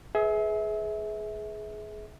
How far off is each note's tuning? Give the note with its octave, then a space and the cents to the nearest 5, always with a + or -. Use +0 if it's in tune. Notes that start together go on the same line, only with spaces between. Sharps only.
G#4 +25 B4 +0 E5 -30